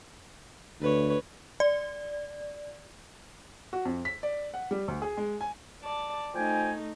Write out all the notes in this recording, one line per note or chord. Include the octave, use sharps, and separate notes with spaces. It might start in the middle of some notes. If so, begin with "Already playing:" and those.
D2 B4 C#5
D5
F#4
F2
B6
D5
F#5
G3
D2
G#4
G#3
G#5
D5 A5
F3 A3 D#4 G5 G#5